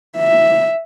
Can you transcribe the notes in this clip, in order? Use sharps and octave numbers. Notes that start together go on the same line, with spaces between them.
E5